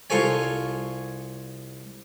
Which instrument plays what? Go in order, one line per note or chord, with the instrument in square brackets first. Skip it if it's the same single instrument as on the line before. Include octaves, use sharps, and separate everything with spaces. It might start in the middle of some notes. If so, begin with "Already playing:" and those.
[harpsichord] C2 F4 A4 C#5 G#5